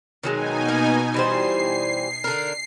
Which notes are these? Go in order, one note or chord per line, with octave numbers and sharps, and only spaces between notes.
B2 D#3 F#3 G#3 D#4 G#5
A#3
E3 G3 C5 C7
D3 A#4